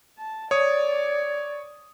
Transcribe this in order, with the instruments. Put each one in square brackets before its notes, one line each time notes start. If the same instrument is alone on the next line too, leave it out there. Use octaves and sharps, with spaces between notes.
[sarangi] A5
[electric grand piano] C#5 D#6 [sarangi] D5